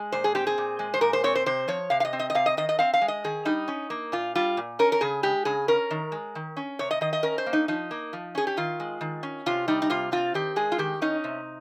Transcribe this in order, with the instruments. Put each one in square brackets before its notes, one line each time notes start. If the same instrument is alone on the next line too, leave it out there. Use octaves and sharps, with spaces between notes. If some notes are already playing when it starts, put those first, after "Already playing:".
Already playing: [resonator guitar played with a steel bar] G#3
A#2 C5
G#4
C4 G4
G#4
A#2
G#3
C5
A#2 A#4
C5
C4 C#5
C5
C3 C5
F3 C#5
C3 F5
F5
D#5
C4
D#5
D#5
C3 F5
D#5
D#3 D#5
D#5
C4 F5
F5
G#3
D#5
D#3 G#4
G3 D#4
C#4
A#3
A#2 F4
G3 F4
A#2
C#4 A#4
A#4
C#3 G#4
G#3 G4
C#3 G#4
C#4 A#4
D#3
G#3
D#3
C#4
C3 C#5
D#5
D#3 D#5
D#5
C#4 A#4
C5
A#3
D#4
F3 D#4
A#3
F3
C#4 G#4
G4
D#3 F4
G#3
D#3
C#4
C3 F4
G3 D#4
D#4
C3 F4
C4 F4
D#3 G4
G#3 G#4
F4
D#3 G4
C#4 D#4
C3